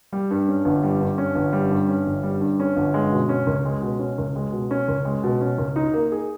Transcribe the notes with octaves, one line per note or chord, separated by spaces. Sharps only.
G3
G2
C#4
G1
G3
G2
C#4
G1
G3
G2
C#4
G1
G3
G2
C#4
G1
G#3
B2
C#4
C#2
G#3
B2
C#4
C#2
G#3
B2
C#4
C#2
G#3
B2
C#4
C#2
D#4
A#3
G#4